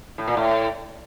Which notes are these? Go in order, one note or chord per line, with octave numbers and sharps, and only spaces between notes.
A2
A#2
A2